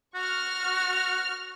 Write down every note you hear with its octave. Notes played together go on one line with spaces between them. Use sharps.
F#4 C#6 F6